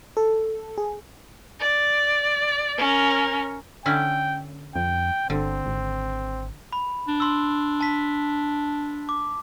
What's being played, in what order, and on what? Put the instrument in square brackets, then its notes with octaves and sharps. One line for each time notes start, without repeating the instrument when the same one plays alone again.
[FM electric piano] A4
G#4
[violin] D5
C#4 A#4
[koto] D3 C#4 E4 [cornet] G5
[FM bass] F2 [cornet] G5
[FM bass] G1 [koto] D3 [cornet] C4
[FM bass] G#1
[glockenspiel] B5
[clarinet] D4
[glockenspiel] C6 E6
A5 B6
D6